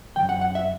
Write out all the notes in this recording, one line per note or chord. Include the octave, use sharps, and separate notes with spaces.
E3 G5
F#2
F#5
F#5
E5